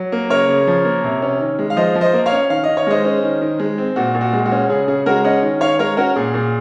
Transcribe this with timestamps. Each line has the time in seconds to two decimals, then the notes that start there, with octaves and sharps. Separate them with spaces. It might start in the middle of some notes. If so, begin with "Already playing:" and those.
Already playing: F#3
0.12 A#3
0.30 C#3 A#4 C#5
0.49 C#3
0.67 F3
0.85 A#3
1.04 C3
1.22 C#4
1.40 D#3
1.59 G#3
1.70 F5
1.77 F3 C5 D#5
1.95 F3
2.01 C5 D#5
2.13 A#3
2.26 C#5 F5
2.32 C#4
2.50 D#3 F5
2.64 D#5
2.69 D#3
2.77 C#5
2.87 G#3 C5 D#5
3.05 C#4
3.23 D#3
3.42 D#3
3.60 G#3
3.78 C4
3.96 A#2 F#4
4.15 A#2
4.21 F#4
4.33 G#3
4.45 F#4
4.52 C#4
4.70 C#3 G#4
4.88 C#3 G#4
5.06 G#3 F#4 A#4
5.24 C#4 D#5 F#5
5.43 D#3
5.61 D#3 C#5 F5
5.79 G#3 A#4 C#5
5.97 C#4 F#4 A#4
6.16 A#2 G#4
6.34 A#2